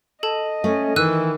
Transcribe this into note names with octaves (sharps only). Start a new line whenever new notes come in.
A4 D#5 A5
A3 C#4
D#3 E3 E6 F#6 D#7